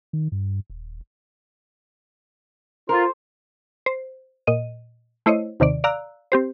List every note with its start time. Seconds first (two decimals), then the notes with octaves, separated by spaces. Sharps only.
0.13 D#3
0.32 G2
0.70 D#1
2.89 F4 A#4 C5
3.86 C5
4.47 A#2 D#5 D#7
5.26 A3 E4 C5 C#5 D#5
5.60 D#2 C3 D#3 D5
5.84 D5 F5 A#5 E6 F#6
6.32 C4 G4 C5